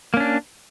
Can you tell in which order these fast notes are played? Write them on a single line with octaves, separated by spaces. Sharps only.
A#3 C#4 D4